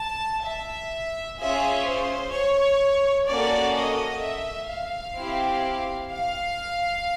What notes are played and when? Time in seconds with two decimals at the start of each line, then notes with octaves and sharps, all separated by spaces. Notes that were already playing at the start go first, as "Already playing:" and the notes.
Already playing: A5
0.46 E5
1.40 C#4 F4 G#4 E5
1.87 C5
2.34 C#5
3.28 A#3 C#4 F#4 A4 D5
3.76 D#5
4.22 E5
4.69 F5
5.16 C4 E4 G4
6.10 F5